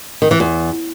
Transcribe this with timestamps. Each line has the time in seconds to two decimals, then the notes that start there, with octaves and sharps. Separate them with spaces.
0.22 D#3
0.31 E3
0.40 E2